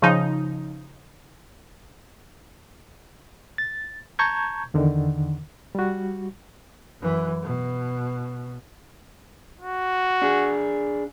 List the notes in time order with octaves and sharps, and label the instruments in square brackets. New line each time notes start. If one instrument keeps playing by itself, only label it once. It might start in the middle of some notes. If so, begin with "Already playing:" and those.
[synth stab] C#3 F3 D#4
[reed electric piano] A6
A5 A#5 C#6 G6 G#6
E2 D3 D#3
G3 F#4
[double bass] F#2 E3
B2
[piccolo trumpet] F#4
[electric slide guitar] D4 G#4